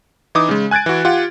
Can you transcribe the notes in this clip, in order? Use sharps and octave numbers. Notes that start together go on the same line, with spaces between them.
E3 D#4 D6 D#6
C#3 G#3
G#5 F#6 G#6 A6 D7
E3 F#4
F4 G4 F#5